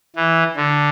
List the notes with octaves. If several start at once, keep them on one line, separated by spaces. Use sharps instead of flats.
E3
D3